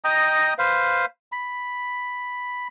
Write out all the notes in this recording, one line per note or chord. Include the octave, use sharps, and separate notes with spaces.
D#5 G5 A#5 D#6
B4 C5 F5
B5